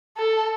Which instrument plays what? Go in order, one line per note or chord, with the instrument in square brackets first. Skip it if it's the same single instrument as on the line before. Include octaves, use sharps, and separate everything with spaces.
[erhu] A4